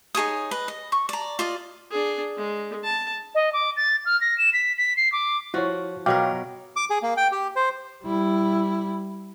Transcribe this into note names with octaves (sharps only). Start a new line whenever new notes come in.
D#4 G#4 C#5 D#6
B4 D#5
D#5
C#6
D5 A#5
F4 D5 D#5
D4 G#4
G#3
A5
D#5
D6
A6
F6
A#6
E7
B6
B6
C7
D6
F3 E4 F#4 C#5
B2 F#3 A#4 F5 G5 D6
D6
G#4
A#3
G5
G4
C5
G3 E4